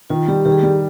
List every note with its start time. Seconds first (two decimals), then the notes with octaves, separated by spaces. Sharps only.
0.10 D#3 F4
0.28 G3 G4
0.45 D#3 G4
0.52 G#4
0.59 G3 G4